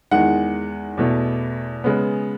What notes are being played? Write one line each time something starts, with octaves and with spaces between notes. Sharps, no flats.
E2 D#3 G#3 F#5
E2 B2 A3
C#3 G#3 B3